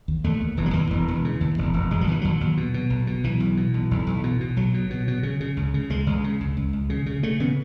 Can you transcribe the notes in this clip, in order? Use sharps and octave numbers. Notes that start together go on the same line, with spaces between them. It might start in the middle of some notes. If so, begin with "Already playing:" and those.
D#2
D#2 A3
D#2
E1 E3
F#3
D#2 E3
E1
E1
C#3
D#2
E1
E1
E1 G#3
F#3
D#2 E3
D#2 F#3
D#2
B2
B2
B1
B2
B1 E3
B1
B2
B1
B1
B1
B2
B2
B1 F#3
B2
B2
B2
C#3
C#3
C#2
C#3
C#2 G#3
C#2
C#3
C#2
C#2
C#2
C#3
C#3
C#3 A3
C#3 B3